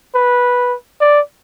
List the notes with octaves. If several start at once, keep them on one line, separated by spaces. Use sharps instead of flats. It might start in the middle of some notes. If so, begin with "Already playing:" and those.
B4
D5